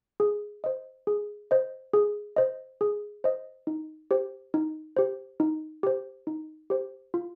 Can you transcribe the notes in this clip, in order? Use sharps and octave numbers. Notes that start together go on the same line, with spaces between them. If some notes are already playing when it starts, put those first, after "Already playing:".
G#4
C5 D#5
G#4
C5 D#5
G#4
C5 D#5
G#4
C5 D#5
D#4
G4 C5
D#4
G4 C5
D#4
G4 C5
D#4
G4 C5
F4